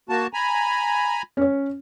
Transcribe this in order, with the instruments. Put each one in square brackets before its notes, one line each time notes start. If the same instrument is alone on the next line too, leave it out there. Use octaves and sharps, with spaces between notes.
[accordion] A#3 F#4 A5
G#5 A#5 B5
[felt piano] C#4 C#5